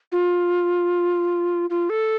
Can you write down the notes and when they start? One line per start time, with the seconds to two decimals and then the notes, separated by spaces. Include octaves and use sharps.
0.12 F4
1.70 F4
1.89 A4